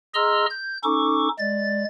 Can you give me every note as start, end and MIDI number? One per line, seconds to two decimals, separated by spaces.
0.15 0.46 68
0.15 0.46 75
0.15 0.46 82
0.15 0.46 84
0.15 0.46 88
0.15 0.46 89
0.50 0.77 91
0.84 1.28 61
0.84 1.28 63
0.84 1.28 69
0.84 1.28 85
0.84 1.28 86
1.39 1.84 56
1.39 1.84 74
1.39 1.84 93